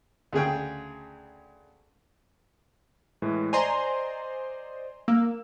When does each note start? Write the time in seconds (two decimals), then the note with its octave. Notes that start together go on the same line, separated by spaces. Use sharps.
0.33 D2 C#3 G#4 G5
3.22 A2 E3 G#3
3.53 C5 D5 D#5 G#5 A#5 C6
5.08 A#3 E6